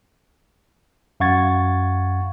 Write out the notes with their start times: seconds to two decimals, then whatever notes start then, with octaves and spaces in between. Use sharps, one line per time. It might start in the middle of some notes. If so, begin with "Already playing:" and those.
1.20 F#2 F5 F#5 C#6 G#6 A6